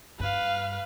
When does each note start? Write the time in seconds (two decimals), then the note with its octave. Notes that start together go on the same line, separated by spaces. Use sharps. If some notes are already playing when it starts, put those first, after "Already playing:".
0.20 G2 B4 F5